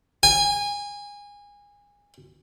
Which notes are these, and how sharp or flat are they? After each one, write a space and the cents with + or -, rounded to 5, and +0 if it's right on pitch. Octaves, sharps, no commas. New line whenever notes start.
G#5 -25